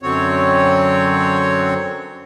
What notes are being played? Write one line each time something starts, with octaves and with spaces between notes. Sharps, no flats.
F#2 D3 F#3 C4 C#5